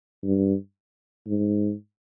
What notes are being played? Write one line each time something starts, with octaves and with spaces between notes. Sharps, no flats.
G2
G#2